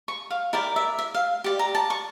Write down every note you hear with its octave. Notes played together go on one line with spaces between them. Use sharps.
C#6
F5
E4 A#4 D5 G5
E5
E5
F5
G4 D5
A#5
A5
C#6